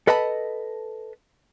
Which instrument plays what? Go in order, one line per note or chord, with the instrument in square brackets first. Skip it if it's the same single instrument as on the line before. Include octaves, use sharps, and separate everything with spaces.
[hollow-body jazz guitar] A4 B4 D#5 F#5 A5 B5